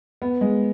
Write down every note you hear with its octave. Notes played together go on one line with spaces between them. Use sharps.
B3
G#3